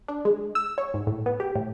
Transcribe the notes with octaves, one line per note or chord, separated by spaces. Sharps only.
D4
G#3
E6
C#5
G#2
A2
B3
G4
A2